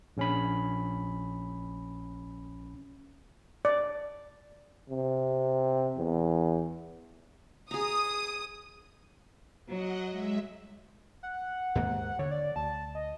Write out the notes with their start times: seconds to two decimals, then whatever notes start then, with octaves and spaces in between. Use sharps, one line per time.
0.17 A#1 C#4 B5
3.65 D5
4.89 C3
5.97 E2
7.71 G#4 A#5 D#6
9.69 F#3 D#5 F#5
10.08 G#3 E5
11.23 F#5
11.75 D#2 G#2 A#3
12.19 D3 C#5
12.31 D5
12.56 D2 A5
12.95 D#5